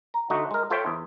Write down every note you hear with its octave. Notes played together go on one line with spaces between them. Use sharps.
A#5
D2 A3 D#4 F#4
G#3 A#4
F4 A4 C5 C#5 E5 G5
E2